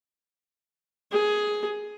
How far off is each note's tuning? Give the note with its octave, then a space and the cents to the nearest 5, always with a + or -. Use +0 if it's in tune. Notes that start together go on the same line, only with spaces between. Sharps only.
G#4 +10